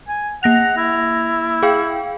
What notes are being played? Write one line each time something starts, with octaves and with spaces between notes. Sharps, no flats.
G#5
A#3 F#5 A#6 F7
E4
G#4 F5 G5